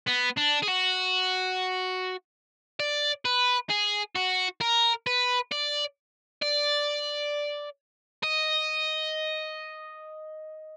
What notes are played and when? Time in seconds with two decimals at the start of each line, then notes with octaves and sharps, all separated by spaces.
0.08 B3
0.38 D4
0.63 G#4
0.68 F#4
2.80 D5
3.25 B4
3.70 G#4
4.15 F#4
4.61 A#4
5.07 B4
5.52 D5
6.42 D5
8.23 D#5